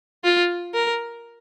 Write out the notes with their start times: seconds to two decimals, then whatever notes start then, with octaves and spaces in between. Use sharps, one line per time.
0.24 F4
0.74 A#4